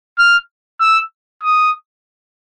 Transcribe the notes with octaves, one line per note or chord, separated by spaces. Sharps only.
F6
E6
D#6